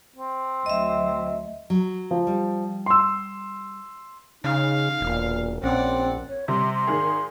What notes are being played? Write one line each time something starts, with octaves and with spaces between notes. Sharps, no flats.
C4
D2 F#3 D#5 E5
F#3
F3
G3
C6 E6
C#3 D#4 F5
E1 A#2
A#1 C4 C#4 D5 F#5
C#5
C3 G3 C6
C6
G#1 D#3 G#4